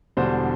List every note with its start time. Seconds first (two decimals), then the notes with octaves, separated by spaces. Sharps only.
0.17 E1 E2 D3 G3 D4 C5